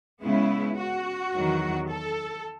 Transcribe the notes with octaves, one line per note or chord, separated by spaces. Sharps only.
C#3 G#3 B3 E4
F#4
E2 D#3 F#3
A4